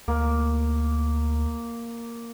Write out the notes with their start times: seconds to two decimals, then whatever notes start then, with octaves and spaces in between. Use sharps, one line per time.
0.08 D2 A#3